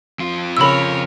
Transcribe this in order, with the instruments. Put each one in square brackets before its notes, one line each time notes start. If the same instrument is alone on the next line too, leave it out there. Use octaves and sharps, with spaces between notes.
[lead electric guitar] F2 F4
[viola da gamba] C#3 A#4 C#5 [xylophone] B5 E6